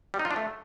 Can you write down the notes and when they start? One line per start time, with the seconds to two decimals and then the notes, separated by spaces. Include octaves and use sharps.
0.14 G3
0.19 D#4
0.25 F4
0.31 D4
0.36 A3